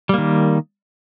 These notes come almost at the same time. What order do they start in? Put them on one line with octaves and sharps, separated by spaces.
G3 A#3 D#3